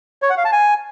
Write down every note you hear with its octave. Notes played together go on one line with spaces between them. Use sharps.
C#5
F#5
F5
A5
G#5